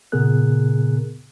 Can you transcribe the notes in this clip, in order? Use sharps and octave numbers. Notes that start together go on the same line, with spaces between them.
A#2 C#3 B3 G#4 A#4 F#6